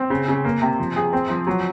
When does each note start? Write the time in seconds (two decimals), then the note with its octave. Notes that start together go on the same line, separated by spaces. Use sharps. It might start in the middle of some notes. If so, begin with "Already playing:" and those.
Already playing: C4
0.10 C#3
0.28 C#3
0.45 A#3
0.62 C3
0.79 F3
0.96 G#4
1.13 C4
1.30 F3
1.47 F#3